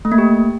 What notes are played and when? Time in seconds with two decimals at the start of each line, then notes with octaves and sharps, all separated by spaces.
0.05 A3
0.12 A#3
0.18 G4